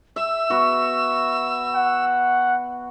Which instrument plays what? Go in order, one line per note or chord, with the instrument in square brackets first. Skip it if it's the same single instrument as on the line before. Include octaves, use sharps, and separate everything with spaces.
[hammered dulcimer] E5 [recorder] E6
[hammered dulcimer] B3 F#4
[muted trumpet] F#5